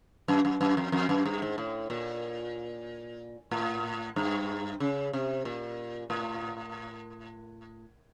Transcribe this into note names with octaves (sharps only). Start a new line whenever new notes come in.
F#2
F#2
F#2
F2
F2
F#2
G2
G#2
A2
A#2
A2
G2
C#3
C3
A#2
A2